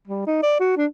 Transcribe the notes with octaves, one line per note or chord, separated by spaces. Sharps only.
G3
D#4
D5
F#4
D4